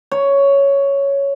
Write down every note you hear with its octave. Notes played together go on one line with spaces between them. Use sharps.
C#5